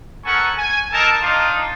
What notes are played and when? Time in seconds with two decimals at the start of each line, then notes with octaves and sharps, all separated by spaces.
0.25 C#4 A4 A#4 F#5 G#5 C#6
0.57 G#5
0.91 A#3 D#4 A4 A#4 A5
1.22 D4 D#4 F4